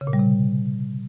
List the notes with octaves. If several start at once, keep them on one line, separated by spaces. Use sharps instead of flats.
C#3
A#2
G3
C3